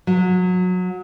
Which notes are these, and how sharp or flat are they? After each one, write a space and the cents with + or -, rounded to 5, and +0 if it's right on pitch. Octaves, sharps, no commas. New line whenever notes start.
F#3 -25